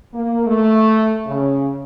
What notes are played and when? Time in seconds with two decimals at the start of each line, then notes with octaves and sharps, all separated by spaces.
0.14 A#3
0.46 A3
1.27 C#3